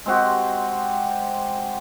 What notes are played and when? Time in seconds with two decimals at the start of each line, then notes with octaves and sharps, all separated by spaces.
0.06 G#3 C4 F#4 G4